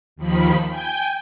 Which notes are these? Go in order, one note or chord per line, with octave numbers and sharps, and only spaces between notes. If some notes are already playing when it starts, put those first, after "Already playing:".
D#2 D#3 F3 B5
G5 G#5 G6